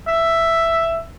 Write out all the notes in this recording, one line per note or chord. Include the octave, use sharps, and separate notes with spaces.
E5